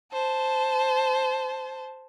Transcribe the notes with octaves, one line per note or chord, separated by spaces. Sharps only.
C5 A5